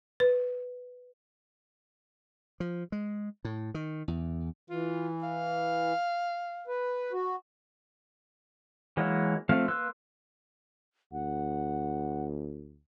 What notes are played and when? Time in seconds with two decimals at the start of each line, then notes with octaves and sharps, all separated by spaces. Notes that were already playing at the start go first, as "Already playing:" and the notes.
0.20 B4
2.60 F3
2.92 G#3
3.45 A2
3.74 D#3
4.08 E2
4.70 E3 F4
5.23 F5
6.67 B4
7.12 F#4
8.97 E3 F#3 G#3 A#3
9.49 F3 A3 C4 F5
9.68 A#3 B4 C6 E6 F#6
11.13 D2 F#5